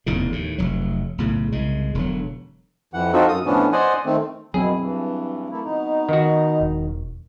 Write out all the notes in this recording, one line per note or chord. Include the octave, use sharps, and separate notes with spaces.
F1 E2 A2 C#3
D#2 A2
F1 F#3
B1 A2 C#3
C2 C#3 G#3
E1 D3 F#3
F2 E3 F#5
C4 D#4 F4 F#4 A4
F#2 D#6
A2 E3 F3 B3 C#4 D4
C5 D5 D#5 F#5 G#5
D#3 A3 C4
F#2 B2 F#3 C4 E4 G#4
G2 E3
A3 A#3 E4
B2 D#4
D#3 F#4
E1